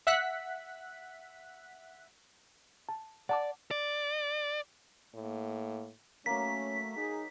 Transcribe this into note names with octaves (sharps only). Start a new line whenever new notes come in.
E5 F#5 F#6 B6
A5
D5 F#5 A5 D6
D5
A2 A#3
F#3 A3 A#3 C#4 B6
D#4 G#4